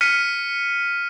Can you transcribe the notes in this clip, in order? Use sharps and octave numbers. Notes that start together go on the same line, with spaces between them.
F6 B6 C#7 D#7